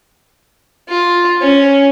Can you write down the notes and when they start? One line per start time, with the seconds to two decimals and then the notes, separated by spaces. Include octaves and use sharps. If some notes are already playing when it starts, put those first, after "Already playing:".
0.89 F4
1.41 C#4